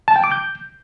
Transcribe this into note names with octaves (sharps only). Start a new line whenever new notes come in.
A5
G5
D6
G6